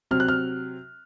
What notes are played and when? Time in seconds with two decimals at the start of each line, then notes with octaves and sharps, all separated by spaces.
0.11 C3 F#3 C4 F6
0.20 F#6
0.28 F6